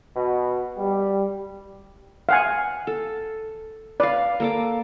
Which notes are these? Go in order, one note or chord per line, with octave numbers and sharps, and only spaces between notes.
B2
G3
F5 F#5 G#5
A4
B4 D5 F5
A#3 A4 D6